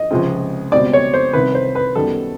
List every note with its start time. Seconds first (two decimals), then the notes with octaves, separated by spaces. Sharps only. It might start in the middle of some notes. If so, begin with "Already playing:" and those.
Already playing: D#5
0.11 C#2 C3 F3 G#3 C4
0.72 C#2 B2 G3 C4 D5
0.93 C#5
1.14 C5
1.33 C2 C3 D#3 B4
1.55 C5
1.75 B4
1.95 F#2 D#3 G3 B3 A4